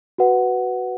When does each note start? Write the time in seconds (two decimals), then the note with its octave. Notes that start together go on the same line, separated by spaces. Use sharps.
0.18 F#4 B4 F#5